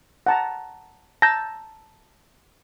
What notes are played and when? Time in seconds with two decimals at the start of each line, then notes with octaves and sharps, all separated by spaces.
0.26 F#5 A5 A#5
1.22 A5 A#5 E6 G6 A#6